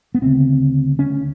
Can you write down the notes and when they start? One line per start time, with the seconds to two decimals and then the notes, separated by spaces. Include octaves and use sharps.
0.14 B3
0.22 D2 C#3 C4
0.99 C#4